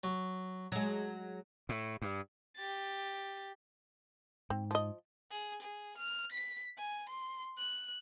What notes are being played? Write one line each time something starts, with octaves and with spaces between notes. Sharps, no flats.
F#3
F#3 G#3 A#5
A2
G2
G4 A6
G#2 C4
F3 D#5
G#4
G#4
F6
B6
G#5
C6
F#6